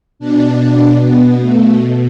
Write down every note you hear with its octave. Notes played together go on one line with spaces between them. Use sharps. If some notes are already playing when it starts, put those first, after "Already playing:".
B2 D4
B3
A3